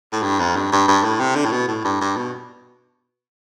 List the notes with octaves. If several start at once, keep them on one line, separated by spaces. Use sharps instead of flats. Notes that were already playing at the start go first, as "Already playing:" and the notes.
A2
G2
F2
G2
G2
G2
A2
C3
D3
A2
B2
A2
G2
G2
B2